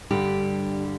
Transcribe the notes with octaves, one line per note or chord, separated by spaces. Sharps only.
G2 D3 G3 G4